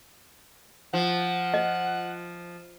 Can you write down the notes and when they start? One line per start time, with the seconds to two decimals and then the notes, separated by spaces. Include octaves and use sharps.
0.93 F3 F#5
1.54 D#5